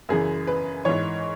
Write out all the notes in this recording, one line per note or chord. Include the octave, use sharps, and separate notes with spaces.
F#2 C#3 E3 G#4
B4
G#2 E3 C#5